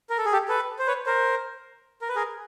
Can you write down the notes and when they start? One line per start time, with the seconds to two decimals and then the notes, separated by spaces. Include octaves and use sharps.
0.10 A#4
0.18 A4
0.26 G#4
0.32 G4 A4
0.48 A4 B4
0.79 C5
0.87 B4 C#5
1.06 A#4 C5
2.01 A#4
2.09 B4
2.15 G#4 A#4